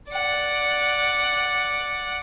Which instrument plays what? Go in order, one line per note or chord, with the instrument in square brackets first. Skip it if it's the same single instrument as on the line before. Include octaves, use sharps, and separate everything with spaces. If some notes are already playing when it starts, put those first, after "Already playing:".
[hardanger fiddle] D5 F#5